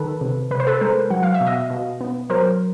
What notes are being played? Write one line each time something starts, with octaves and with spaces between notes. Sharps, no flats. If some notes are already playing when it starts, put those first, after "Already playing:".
Already playing: D#3 A4 B4
C3
C3 B4
C5
A4 B4
G#3 A#4 C5
F#3 F#5
F5
E5
B2
D#5 F5
B2
B3
F#3 A#4 C5